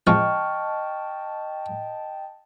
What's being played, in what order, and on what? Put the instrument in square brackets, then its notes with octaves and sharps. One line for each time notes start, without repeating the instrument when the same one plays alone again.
[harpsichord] C3 F3 G#3 [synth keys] D#5 G5 A5 [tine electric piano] C#6 F6